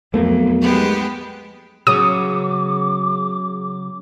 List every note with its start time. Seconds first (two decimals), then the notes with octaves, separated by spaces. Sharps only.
0.14 B1 F2 A3 A#3
0.61 G#3 B3 G4
1.87 C#3 F#3 B3 D6 D#6